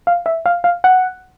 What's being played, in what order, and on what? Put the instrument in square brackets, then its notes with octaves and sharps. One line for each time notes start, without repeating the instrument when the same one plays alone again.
[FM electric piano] F5
E5
F5
F5
F#5